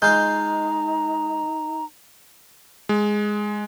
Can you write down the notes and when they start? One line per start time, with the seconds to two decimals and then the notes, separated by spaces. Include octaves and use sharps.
0.02 G#3 D#4 F4 A#5 G6
2.89 G#3